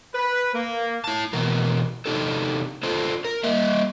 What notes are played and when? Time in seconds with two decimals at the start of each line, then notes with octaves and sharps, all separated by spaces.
0.14 B4
0.53 A#3
1.04 E4 A5
1.33 B2 E3 A#4
2.06 C3 F#3 D4 D#4 G4 A4
2.83 D4 F4 A4 C5
3.25 A#4
3.44 G3 A#3 D#5 E5